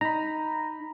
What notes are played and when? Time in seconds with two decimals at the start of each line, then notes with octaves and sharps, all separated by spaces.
0.01 D#4 A#5 B5